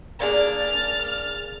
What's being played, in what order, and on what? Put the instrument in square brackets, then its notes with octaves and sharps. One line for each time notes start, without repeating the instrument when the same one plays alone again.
[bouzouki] A#3 D4 G#4 [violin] F6 A6